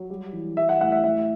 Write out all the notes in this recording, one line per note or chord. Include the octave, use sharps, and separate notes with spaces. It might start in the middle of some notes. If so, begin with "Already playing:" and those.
Already playing: F#3
G3
E3
G3 E5
F#5
A2 F#5
E5
A2 E5